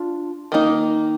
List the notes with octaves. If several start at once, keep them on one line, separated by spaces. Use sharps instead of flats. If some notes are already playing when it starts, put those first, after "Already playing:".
Already playing: D4 F4
D#3 A#3 D#4